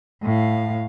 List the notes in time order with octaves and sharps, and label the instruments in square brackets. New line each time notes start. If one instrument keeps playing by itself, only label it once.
[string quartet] A2 F5